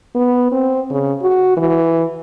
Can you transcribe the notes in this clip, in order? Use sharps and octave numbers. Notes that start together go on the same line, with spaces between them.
B3
C4
C#3
F#4
E3